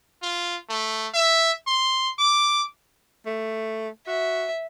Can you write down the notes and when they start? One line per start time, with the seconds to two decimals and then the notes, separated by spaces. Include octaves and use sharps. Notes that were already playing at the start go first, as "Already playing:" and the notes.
0.22 F4
0.69 A3
1.14 E5
1.67 C6
2.18 D6
3.26 A3
4.07 F#4 E5